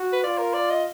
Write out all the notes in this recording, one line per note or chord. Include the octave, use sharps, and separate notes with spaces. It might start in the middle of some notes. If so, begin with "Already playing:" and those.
Already playing: F#4
B4
F4 D5
A#4
D5
D#5